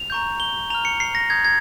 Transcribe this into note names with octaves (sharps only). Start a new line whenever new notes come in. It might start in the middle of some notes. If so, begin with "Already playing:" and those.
Already playing: F7
A#5 C#6 G6
G7
A#5 F6 F7
C#7
C7
A#6
A#5 D#6 G6 G#6
G#6